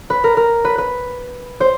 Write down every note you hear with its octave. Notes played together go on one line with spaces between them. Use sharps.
B4
A#4
A#4
B4
B4
C5